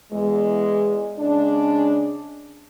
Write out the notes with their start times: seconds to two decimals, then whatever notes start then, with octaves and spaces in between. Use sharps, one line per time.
0.12 E2 G#3
1.19 C#3 G#3 D4